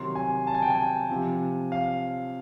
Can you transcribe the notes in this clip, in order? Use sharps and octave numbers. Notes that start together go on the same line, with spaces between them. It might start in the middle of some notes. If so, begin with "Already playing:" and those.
Already playing: C3 D#3 F#3 C6
G#5
A5
G#5
G5
G#5
C3 F3
F5